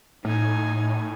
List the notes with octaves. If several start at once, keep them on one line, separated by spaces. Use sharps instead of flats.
A2 D#4 G#5